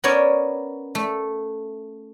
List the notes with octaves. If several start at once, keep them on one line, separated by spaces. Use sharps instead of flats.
B3 C#4 A#4 C#5 D5
A3